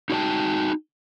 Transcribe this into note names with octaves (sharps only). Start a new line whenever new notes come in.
D#4 F#4 G#4 C#5 G5 A5